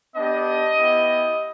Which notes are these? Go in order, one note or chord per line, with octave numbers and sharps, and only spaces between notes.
B3 D4 G4 D#5
B3 E4 G4